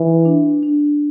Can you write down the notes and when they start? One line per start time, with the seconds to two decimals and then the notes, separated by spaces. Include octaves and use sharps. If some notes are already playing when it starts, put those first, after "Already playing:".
Already playing: E3
0.25 D4
0.63 D4